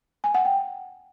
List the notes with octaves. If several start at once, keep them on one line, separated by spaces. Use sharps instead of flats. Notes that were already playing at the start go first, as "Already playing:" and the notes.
G#5
F#5
G5